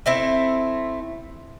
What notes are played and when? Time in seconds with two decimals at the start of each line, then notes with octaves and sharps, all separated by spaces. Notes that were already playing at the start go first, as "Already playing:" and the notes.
0.06 A3 C4 E4